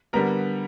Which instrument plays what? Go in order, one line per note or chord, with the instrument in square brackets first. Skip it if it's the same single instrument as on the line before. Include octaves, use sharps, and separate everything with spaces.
[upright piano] D3 G3 B3 A#4 A#5